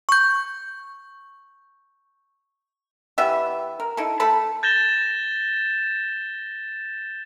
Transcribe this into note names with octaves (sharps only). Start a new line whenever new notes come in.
C#6 G6
E3 B3 G4 E5
A#4
D#4 E4 A4
A3 A4 A5 B5
G6 A6 A#6 E7 G7